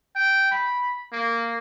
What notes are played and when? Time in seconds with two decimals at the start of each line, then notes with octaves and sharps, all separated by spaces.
0.15 G5
0.52 B5
1.13 A#3